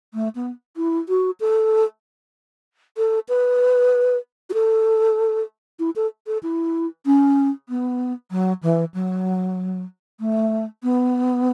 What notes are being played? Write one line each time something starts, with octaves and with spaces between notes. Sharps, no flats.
A3
B3
E4
F#4
A4
A4
B4
F#4
A4
E4
A4
A4
E4
C#4
B3
F#3
E3
F#3
A3
B3